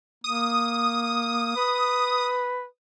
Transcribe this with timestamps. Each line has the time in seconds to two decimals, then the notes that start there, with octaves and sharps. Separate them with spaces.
0.24 A#3 D#6
1.56 B4